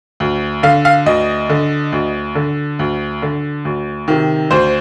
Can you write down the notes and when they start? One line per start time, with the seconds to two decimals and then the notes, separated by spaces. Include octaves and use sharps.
0.20 D2
0.63 D3 F5
0.85 F5
1.06 D2 D#5
1.49 D3
1.92 D2
2.35 D3
2.79 D2
3.22 D3
3.65 D2
4.08 C3 D#3
4.51 D2 C5